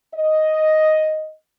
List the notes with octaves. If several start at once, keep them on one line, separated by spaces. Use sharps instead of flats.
D#5